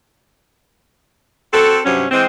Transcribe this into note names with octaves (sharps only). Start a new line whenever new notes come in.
C4 F#4 A4
G2 C3 F#3 C#4
E3 G#3 C4